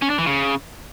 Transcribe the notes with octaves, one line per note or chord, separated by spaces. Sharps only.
C#4
D4
E3
C#3